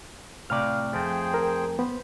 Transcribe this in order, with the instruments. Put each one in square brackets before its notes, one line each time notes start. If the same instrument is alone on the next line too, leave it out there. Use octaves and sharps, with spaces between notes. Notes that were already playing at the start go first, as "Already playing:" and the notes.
[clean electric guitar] A2 C3 D5 [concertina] F5 [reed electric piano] F6
[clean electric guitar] F2 A3 [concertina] G#4 C5 G5
[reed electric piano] A#4
[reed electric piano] B3 [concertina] C5 B5